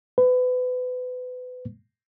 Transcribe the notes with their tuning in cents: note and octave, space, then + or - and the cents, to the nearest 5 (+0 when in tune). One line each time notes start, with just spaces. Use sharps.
B4 +30